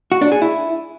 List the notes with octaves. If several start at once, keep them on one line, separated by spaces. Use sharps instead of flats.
F#4
D4
G#4
E4